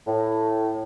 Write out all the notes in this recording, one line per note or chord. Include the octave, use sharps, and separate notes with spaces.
A2